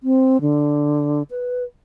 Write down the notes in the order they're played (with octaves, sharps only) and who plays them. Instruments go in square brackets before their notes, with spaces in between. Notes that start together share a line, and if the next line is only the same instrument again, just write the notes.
[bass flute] C4
D3
B4